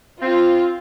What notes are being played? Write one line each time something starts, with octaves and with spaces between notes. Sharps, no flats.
C4 F4